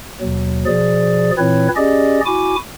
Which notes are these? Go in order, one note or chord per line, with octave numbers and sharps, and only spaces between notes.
D#2 B2 F#3
B2 F3 G#4 D5
A#2 E3 C4 E4 B4 C#5
C#4 G4 G#4 D5 D#5
E4 F#4 G#5 D6